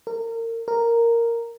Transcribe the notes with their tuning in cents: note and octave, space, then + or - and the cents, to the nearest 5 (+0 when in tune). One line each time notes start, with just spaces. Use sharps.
A#4 -30
A#4 -5